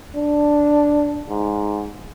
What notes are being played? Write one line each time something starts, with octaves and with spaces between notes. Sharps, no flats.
D4
G#2